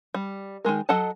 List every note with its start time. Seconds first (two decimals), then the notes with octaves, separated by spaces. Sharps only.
0.14 G3
0.65 D#3 F#3 G#3 A#4
0.89 F#3 A4 D#5 F#5 A5